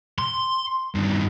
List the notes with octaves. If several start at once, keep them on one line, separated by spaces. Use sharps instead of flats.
C6
G2 D#3